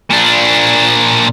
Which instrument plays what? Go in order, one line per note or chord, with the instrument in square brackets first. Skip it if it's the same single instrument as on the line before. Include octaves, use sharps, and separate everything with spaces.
[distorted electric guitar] A#2 D4